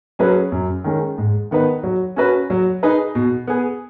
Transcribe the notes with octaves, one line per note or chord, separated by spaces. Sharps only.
F#3 C#4 G#4 B4
F#2
D#3 G#3 C#4
G#2
D#3 B3 D#4 B4
F#3
C#4 F#4 B4
F#3
D#4 G#4 B4
B2
B3 G#4